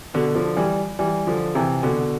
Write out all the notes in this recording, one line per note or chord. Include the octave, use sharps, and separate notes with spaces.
B2 D3
D3 F3
E3 G3
E3 G3
D3 F3
C3 E3
B2 D3